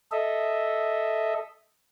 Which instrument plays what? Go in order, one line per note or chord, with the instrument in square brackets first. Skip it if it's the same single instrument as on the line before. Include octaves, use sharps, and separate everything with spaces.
[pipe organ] A4 D#5 E5